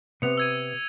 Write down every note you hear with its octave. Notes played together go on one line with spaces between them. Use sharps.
C3 B3 C#7 F7
E6 G#6 D#7